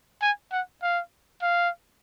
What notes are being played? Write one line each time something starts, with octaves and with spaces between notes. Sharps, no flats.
G#5
F#5
F5
F5